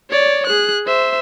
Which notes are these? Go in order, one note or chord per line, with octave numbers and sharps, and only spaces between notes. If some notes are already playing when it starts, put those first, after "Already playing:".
C#5 D5
G#4 F#6
C5 E5